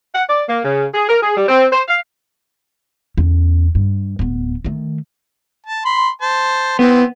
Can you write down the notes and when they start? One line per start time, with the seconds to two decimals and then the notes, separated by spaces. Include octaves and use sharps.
0.15 F#5
0.29 D5
0.49 A#3
0.65 C#3
0.94 G#4
1.09 A#4
1.23 G#4
1.37 G3
1.49 C4
1.72 C5
1.88 F5
3.18 E2 C#4
3.75 G2
4.19 D1 B3
4.65 D#3 A3
5.66 A5
5.85 B5 C6
6.22 C5 A5
6.79 E3 B3 C4